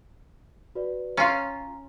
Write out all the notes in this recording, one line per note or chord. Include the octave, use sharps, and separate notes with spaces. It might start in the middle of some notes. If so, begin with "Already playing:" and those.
F#4 B4 D5
C#4 F4 A#5